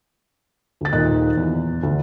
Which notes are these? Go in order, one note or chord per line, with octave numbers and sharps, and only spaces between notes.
D2 A6
D#1 A#2 D#4 D#5 F#6
E2
D2 D3